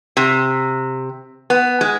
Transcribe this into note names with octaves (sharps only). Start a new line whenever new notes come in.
C3
B3
G#3